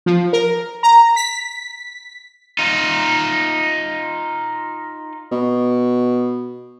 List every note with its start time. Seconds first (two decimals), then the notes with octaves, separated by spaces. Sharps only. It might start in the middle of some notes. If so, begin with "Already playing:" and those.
0.06 F3
0.33 A#4
0.83 A#5
1.16 B6
2.59 D#4 F4
5.32 B2